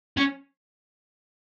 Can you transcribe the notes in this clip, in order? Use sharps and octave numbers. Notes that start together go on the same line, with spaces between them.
C#4